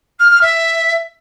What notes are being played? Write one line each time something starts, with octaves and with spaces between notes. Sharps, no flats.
F6
F6
E5